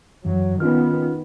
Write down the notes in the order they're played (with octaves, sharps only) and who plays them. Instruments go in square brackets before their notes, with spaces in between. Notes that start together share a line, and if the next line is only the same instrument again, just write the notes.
[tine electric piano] F#2 E3 [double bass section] F#3
[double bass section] D#3 B3 [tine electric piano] C#4 F4 F6